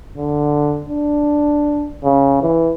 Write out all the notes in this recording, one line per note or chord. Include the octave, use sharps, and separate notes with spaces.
D3
D4
C#3
E3